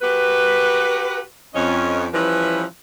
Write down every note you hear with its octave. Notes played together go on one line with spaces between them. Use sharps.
F#4 G4 A#4 B4
F2 C#4 D#5
E3 F3 G3 C#4 E4 B4